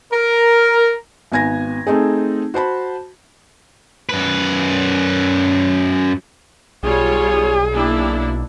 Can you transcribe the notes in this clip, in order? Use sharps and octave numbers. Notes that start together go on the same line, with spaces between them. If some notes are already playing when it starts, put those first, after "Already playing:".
A#4
G#1 B3 G#5 G#6 A#6
A3 C4 D#4 G#4
F#4 C5 A5 B5
F#2 B4
B1 G3 F4 G#4 C#5
A#3 D4 E4